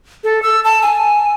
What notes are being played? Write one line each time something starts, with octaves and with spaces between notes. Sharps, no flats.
A4
E6
A5
G#5